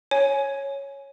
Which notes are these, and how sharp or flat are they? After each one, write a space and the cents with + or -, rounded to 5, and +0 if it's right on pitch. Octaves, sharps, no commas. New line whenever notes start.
C#5 -5 G#5 +15